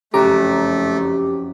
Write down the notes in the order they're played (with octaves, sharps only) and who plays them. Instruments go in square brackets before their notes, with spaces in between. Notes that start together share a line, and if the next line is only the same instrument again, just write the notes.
[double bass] F#1 F2 [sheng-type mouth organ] A3 [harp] C#4 F#4 [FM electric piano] G4 A#5 D6